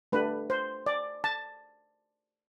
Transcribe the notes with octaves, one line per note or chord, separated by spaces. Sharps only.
A3 D4 G4 B4
C5
D5
A5